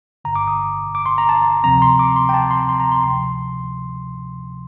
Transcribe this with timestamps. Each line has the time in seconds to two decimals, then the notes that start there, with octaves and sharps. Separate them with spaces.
0.25 G1 G2 D3 A#5
0.36 D6
0.48 D#6
0.95 D6
1.06 C6
1.18 A#5
1.29 A5
1.64 D2 C3 F3 C4 A#5
1.82 C6
1.99 D6
2.16 C6
2.29 G5
2.34 A5
2.51 C6
2.69 C6
2.80 A#5
2.92 C6
3.03 D2 C3 F3 C6